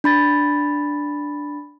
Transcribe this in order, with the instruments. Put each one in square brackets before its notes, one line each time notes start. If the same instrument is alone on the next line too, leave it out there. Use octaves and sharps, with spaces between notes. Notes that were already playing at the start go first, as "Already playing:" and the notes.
[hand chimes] D4 B5 A6